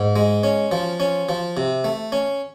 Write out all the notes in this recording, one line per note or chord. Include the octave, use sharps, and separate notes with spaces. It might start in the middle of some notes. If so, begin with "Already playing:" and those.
Already playing: G#2
G#3
C#4
F3
C#4
F3
C3
A3
C#4